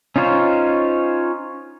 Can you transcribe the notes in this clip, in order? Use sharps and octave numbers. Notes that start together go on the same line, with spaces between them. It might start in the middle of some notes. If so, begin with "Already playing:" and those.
C#4 D#4 F4 C5 C#5